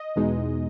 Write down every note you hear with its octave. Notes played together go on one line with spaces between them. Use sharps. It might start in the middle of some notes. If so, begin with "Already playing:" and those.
Already playing: D#5
E2 B2 G#3 D#4